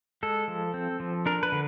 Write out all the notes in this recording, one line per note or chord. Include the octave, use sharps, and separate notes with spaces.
G#3 A4
F3
C4
F3
D4 A#4
B4
D3